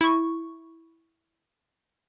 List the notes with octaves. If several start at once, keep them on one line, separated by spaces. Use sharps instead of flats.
E4 C#6